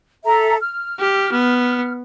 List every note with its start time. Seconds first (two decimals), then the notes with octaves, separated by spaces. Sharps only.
0.25 A4 E5 A#5
0.61 F6
0.99 G4
1.32 B3